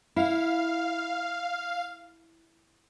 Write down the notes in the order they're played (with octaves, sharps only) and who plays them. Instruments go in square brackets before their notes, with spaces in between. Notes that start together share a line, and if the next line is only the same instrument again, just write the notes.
[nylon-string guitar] E4 [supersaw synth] F5